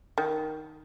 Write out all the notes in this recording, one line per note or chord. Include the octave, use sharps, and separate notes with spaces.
D#3